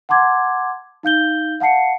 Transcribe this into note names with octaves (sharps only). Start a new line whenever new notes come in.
F#5 A5 C6 D6 G#6
D#4 F5 G6 G7
F5 F#5 A5 C7 C#7